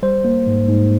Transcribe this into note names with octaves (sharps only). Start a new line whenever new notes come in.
G3 C5
A#3
G#2
G#2